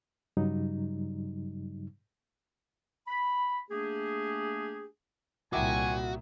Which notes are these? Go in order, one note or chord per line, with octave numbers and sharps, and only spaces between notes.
G2 C#3 F#3 G3 D#4
B5
A3 A#3 D4 G4 G#4
C2 A#2 D#3 E4 F#4 G#5 D6